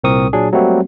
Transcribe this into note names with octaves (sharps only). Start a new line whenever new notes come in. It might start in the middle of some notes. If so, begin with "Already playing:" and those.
C2 A#2 C4 A#4 C#6 D#6
A#2 F#3 D4 G#4
F#3 G3 A3 A#3 C4 F#4